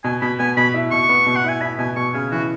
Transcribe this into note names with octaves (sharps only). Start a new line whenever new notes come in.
B2 G#5
B2 B5
B3 G#5
B2 B5
E4
B2 C#6
B3
B2
F#5
E4
G#5
E4 B5
B2 G#5
B2 C#6
C#3 G#5
E3 F#4